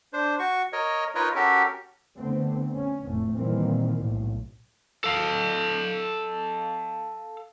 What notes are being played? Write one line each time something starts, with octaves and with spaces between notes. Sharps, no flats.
D4 C5
F#4 C#6
A#4 C#5 D#5
D#4 F4 A#4 B4 C#5 D#5
C#4 F#4 G4 A4 A#4
D3 A3 B3 C4
C#4
F1 A2 A3
A#2 D#3 E3 G3 A#3 C4
B1 A2
A4 F5